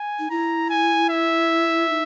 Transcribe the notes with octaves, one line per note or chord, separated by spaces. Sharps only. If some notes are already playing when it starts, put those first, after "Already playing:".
Already playing: G#5
D#4
E4 A#5
G#5
E5
D#4